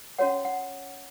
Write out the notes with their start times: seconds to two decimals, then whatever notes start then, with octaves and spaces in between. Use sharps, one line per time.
0.18 C#4 F#4 C#5 F#5
0.45 F#5